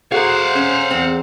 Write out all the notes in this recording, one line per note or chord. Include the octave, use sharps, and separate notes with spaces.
F#4 G#4 A4 C5 F5 F#5 A#5
C#4
E2 C4